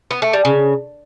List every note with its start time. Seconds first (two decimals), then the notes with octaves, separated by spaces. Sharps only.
0.11 B3
0.22 A3
0.33 G3
0.45 C#3